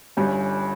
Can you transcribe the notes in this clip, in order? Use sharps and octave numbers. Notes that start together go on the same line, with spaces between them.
G1 G2 G3 C#4